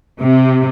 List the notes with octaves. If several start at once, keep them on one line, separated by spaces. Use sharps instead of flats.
C3